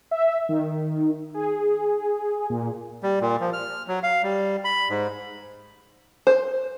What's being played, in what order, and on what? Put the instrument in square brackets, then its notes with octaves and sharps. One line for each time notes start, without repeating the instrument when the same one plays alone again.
[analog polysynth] E5
D#3
G#4
A#2
[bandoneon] G3
A#2
F3
F6
F#3
F5
G3
B5
G#2
[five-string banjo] C5